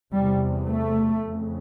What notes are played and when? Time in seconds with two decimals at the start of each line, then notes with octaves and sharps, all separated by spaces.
0.13 E2 C3 G3
0.67 A3
1.21 F2 C#3